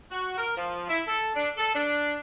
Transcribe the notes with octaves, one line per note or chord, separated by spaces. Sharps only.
F#4
A#4
F3
E4
A4
D4
A4
D4